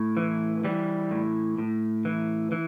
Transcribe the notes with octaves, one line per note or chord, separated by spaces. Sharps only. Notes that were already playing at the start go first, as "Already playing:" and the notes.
Already playing: A2
E3
E3 G3
A2
A2
E3
E3